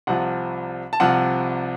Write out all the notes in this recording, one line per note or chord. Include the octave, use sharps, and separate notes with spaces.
C2 C3 F3 F#5
A5
C2 C3 F3 F#5